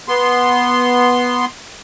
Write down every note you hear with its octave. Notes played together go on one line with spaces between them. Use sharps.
B3 C6